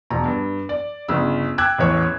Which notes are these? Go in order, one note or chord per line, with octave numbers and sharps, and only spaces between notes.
E1 A#5
G2
D5
G1 C#3 E6
G5 D6 E6 F#6 G#6
A1 E2 C#5